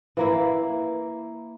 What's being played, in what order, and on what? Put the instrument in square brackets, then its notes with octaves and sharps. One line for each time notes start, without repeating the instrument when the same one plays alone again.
[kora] E3 A#3 E4